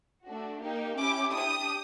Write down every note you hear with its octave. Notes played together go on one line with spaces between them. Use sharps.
A3 D4 F#4
A#3 D#4 G4
C#4 E4 G4 D6
D4 G4 D#6